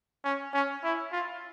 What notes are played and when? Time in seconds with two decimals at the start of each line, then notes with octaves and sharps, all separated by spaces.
0.25 C#4
0.53 C#4
0.84 E4
1.12 F4